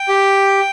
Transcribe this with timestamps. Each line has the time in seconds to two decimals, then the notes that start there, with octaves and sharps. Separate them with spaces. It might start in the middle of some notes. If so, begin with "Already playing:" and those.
Already playing: G5
0.09 G4